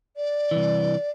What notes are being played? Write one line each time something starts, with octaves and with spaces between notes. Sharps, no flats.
D5
C2 E3